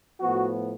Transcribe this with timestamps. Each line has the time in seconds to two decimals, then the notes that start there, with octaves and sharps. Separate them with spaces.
0.20 A2 F3 B3 F#4